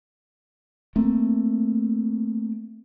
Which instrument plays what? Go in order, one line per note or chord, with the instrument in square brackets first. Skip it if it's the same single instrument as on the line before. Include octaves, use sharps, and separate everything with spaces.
[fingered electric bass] A3 A#3 C4